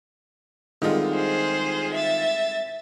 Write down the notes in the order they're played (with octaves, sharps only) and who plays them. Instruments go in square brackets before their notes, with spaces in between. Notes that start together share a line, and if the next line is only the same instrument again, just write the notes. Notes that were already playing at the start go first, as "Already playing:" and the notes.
[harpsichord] C2 D3 G#3 [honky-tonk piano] D#3 F4
[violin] G#4 C5
E5 A6